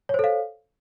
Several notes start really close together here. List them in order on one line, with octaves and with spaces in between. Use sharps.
C#5 C5 A4 F5